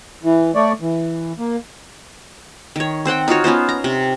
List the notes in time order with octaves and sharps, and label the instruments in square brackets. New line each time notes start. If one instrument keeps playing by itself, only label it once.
[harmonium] E3
A3 C#5 D5
E3
A#3
[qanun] D#3 C#5
C4 C5 F#5 G5
D#4 F4 F#4 C#5
B3 C#4 F4 C5
A#5
C3